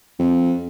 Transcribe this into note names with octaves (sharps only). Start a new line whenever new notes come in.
F2